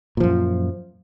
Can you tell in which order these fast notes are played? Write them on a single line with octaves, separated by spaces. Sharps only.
A#2 F3 F#2